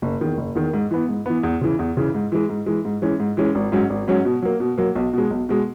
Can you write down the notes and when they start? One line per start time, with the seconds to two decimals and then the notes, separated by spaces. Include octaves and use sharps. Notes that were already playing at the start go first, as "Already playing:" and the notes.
0.02 F#1
0.21 E2 D#3
0.38 F#1
0.55 E2 D#3
0.73 G#2
0.91 E3 B3
1.09 G#2
1.26 E3 B3
1.43 E2
1.61 C#3 E3
1.79 E2
1.97 C#3 E3
2.15 G#2
2.32 E3 G#3
2.49 G#2
2.66 E3 G#3
2.85 G#2
3.02 E3 G#3 C#4
3.20 G#2
3.37 E3 G#3 C#4
3.55 G#1
3.72 G#2 F#3 C#4
3.90 G#1
4.08 G#2 F#3 C#4
4.25 B2
4.42 F#3 A#3
4.60 B2
4.78 F#3 A#3
4.96 B1
5.13 B2 G#3
5.30 B1
5.49 B2 G#3